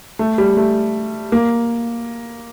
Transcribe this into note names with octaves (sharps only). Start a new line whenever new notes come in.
A3
G3
A3
A#3